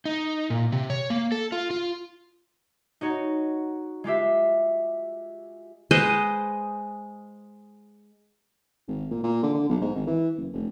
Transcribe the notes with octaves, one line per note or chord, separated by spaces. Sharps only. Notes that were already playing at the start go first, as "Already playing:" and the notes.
D#4
A#2
C3
C#5
A#3
A4
F4
F4
D#4 F#4 C#5
G#3 F4 G4 E5
G#3 B4 C5 D#5
G#1
A#2
A#2
D3
D3
B1
G#2
G#1
E3
F#1
F1